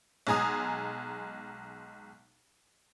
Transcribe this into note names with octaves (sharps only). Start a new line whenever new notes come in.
B1 G#3 G#5 A#5 D#6